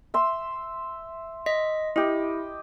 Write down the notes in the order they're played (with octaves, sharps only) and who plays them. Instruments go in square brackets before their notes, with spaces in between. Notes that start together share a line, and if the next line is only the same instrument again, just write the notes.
[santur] E5 C6
[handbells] D#5 B6
[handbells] E4 [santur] G4 D#5